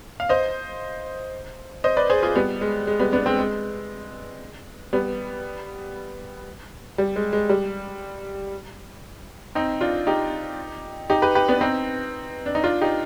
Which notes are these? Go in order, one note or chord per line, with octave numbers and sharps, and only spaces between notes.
F5
C5 D#5
C5 D#5
B4 D5
G#4 C5
F4 G#4
G3 B3
G#3
G#3
G3 B3
B3 D4
G#3 C4
G#3
G3 B3
G3
G#3
G#3
G3
C4 D#4
D4 F4
D#4 G4
D#4 G4
G4 B4
G4 B4
B3 D4
C4 D#4
D4
D#4
D4 F4
D#4 G4